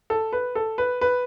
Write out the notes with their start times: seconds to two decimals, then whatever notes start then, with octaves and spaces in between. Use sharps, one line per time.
0.10 A4
0.33 B4
0.55 A4
0.78 B4
1.01 B4